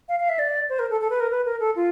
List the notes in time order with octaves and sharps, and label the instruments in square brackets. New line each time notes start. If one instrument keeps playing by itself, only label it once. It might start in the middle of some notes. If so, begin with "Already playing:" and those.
[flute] F5
F5
E5
D5
C5
A#4
A4
A4
B4
A#4
B4
A#4
A4
F4